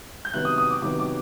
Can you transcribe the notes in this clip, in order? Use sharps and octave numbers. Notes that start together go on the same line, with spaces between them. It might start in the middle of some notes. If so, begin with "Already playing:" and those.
G6
C3 D#3 F#3 B3 F#6
D#6
D#6
D6
C3 D#3 F#3 B3 D6
D6